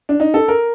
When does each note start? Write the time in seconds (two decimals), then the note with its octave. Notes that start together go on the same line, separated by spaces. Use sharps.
0.09 D4
0.20 D#4
0.34 A4
0.48 A#4